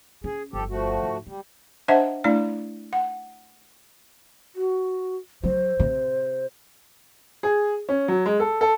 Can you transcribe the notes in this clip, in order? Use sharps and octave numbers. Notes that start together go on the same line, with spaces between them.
C#4 G#4
G1 F3 G4 A4
F3 A3 F#4
G#2
G3 G#3
D4 C5 D#5 E5 F#5 A5
A3 D4 E4 D5
F#5
F#4
F#3 C5
C3
G#4
C#4
F#3
G#3
A4
A4